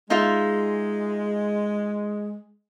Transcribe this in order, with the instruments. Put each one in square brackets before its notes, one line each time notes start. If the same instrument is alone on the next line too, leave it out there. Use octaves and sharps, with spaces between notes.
[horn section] G#3 [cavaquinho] D#4 F4 E5